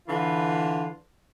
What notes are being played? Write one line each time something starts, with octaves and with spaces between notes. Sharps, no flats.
D3 E3 F4 B4